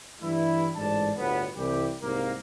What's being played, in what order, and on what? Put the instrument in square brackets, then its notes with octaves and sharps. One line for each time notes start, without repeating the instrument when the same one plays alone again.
[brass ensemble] G2 E3 G3 A3 E4
A1 G#2 D5 A5
G1 D2 A2 B3
C2 E3 G4
C2 G#2 A#3